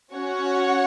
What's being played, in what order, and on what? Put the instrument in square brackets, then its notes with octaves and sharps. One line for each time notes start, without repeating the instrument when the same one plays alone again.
[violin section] C#4 F#4 C#5 F#5